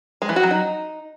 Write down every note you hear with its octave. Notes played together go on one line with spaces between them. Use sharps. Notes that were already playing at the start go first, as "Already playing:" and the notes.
G#3
E3
F#4
F#3
D#4